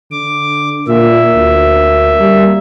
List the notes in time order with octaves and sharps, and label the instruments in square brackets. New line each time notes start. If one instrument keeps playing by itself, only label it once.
[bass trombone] D3 [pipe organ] D6
[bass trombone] A#2 [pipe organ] A#3 E5
[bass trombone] D2
G3